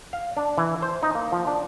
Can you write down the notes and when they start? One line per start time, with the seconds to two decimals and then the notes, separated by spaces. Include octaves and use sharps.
0.13 F5
0.37 D4
0.58 E3
0.82 C5
1.03 D#4
1.15 A#3
1.32 F3
1.47 D4